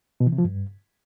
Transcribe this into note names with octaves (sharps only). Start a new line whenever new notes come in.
B2
E3
C3
F3
G2